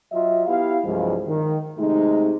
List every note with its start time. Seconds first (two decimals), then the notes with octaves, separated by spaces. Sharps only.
0.12 F#3 F4 D#5 E5
0.47 B3 E4 G4 F5
0.85 C2 G2 F3 F#3 G#3
1.27 D#3
1.78 C3 G#3 A3 D#4